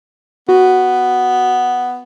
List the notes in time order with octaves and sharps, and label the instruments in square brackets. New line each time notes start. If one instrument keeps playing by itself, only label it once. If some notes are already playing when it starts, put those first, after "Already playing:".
[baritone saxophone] B3 [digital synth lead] F#4